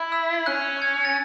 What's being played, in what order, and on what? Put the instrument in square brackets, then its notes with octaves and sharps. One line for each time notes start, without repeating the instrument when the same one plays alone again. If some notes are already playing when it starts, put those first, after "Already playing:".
Already playing: [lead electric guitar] E4
[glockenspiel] E6
[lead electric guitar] C#4 [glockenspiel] F#6
[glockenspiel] G#6
A6